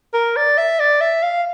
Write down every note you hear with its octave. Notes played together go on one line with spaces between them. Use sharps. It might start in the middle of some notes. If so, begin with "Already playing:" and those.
A#4
D5
E5
D5
E5
F5